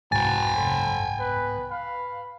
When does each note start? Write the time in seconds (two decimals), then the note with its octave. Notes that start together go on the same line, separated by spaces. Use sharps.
0.12 C2 G#2 F#4 B4 G5 G#5 A#5 A6
0.55 A4 C5 B5
1.18 B3 B4
1.70 B4 F5 B5